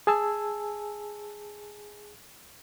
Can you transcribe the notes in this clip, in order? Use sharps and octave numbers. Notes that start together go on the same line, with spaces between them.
G#4 G#5 A5 E6